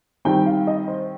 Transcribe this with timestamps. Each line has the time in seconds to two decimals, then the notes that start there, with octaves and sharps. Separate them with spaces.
0.25 D#3 G3 C4 G5
0.46 F5
0.67 D#5
0.88 C5